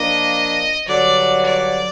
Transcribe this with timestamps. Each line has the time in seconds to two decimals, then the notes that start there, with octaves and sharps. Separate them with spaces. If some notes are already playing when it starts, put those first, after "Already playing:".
Already playing: F3 A#3 D4 D#5
0.88 G2 D3 F#3 D5
1.46 D5